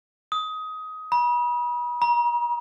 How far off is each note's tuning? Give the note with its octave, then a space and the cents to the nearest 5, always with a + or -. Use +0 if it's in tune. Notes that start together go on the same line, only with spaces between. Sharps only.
D#6 +20
B5 -35
A#5 +40